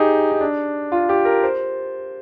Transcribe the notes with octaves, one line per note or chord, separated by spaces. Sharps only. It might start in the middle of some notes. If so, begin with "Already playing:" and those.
Already playing: D#4 G4 G#4
D#4
D4
F4
G4
A#4
C5